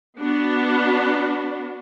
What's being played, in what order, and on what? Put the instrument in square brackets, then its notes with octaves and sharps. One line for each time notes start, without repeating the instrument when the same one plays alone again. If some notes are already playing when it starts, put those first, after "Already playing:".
[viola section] B3 D4 F#4